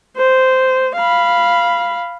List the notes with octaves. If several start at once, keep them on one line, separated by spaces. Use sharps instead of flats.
C5
F5 B5